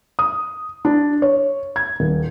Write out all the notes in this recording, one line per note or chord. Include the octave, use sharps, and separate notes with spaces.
D#6
D4
C#5
G#6
D#1